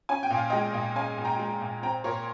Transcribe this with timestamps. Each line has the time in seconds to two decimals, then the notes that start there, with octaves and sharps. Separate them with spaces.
0.09 C#4 G#5
0.23 G5
0.30 A#2
0.36 F5
0.50 G#3 D#5 G5
0.74 A#2
0.96 C#4 F5 G#5
1.18 A#2
1.25 G5 A#5
1.40 G#3
1.61 A#2
1.83 C4 G5 A#5
2.04 A#2 A#4 C#5